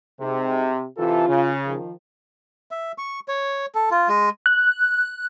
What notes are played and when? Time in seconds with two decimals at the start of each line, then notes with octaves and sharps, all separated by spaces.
0.21 C3 G#3 D#4 G#4
0.98 C3 E3 F4 A4
1.29 C#3
1.66 D#3 F3
2.71 E5
2.98 C#6
3.28 C#5
3.75 A4
3.91 F4
4.09 G#3
4.46 F#6